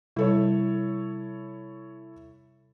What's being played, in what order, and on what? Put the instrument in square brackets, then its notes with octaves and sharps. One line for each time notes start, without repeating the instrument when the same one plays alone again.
[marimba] C3 G3 [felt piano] E4 A4 C#5